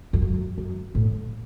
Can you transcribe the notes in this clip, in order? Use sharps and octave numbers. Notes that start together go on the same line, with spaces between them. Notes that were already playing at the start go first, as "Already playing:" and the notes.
F2
F#2
F#2
A2